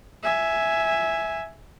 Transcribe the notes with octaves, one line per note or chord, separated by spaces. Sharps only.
E5 G#5